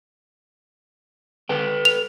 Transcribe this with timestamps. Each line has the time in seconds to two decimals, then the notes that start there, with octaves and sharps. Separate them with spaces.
1.49 A4 B4 G5
1.85 F7